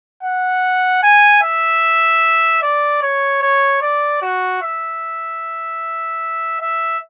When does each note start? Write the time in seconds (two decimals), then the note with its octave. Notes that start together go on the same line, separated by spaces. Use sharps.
0.23 F#5
1.03 G#5
1.42 E5
2.63 D5
3.02 C#5
3.42 C#5
3.82 D5
4.22 F#4
4.63 E5
6.61 E5